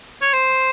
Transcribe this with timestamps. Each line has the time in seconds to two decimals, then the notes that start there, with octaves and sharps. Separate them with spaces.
0.22 C#5
0.33 C5